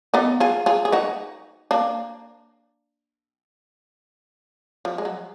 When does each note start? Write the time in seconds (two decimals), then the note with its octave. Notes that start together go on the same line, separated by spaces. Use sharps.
0.14 B3 D#4
0.40 F4 G#4
0.66 F4 G#4
0.85 G#4
0.92 D#4 F#4
1.71 A#3 D4
4.85 F3
4.98 G#3
5.05 F#3